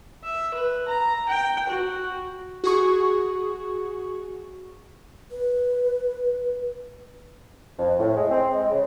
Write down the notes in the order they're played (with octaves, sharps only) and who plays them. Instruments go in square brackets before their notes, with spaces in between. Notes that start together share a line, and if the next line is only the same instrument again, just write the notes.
[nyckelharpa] E5
B4
A#5
G5
F#4
[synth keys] F#4 G#4 C#6
[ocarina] B4
[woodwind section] F2
A2
G#3
C4
G#3
C#3